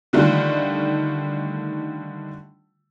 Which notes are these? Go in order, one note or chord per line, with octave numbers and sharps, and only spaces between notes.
D3 D#3 G3 A3 F4